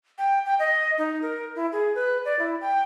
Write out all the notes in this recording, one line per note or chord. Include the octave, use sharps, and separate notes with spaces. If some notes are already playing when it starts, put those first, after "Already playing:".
G5
G5
D#5
D#4
A#4
E4
G#4
B4
D5
E4
G5